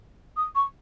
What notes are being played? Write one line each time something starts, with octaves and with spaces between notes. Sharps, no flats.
D#6
C#6